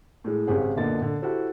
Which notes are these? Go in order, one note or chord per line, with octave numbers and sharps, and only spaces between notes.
A2 G#3
G#1 C#3 G4 G#4 C5 F#5
F#1 A#2 D3 B3 D#5 A6
D3
E4 F#4 G4 A4 C5